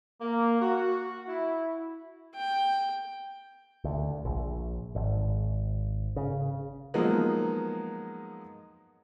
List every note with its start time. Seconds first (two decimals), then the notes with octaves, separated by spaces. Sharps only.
0.21 A#3
0.61 F#4
1.28 E4
2.35 G5
3.84 D2
4.25 A#1
4.95 G#1
6.16 C#3
6.94 F3 F#3 G#3 A#3 B3 D#4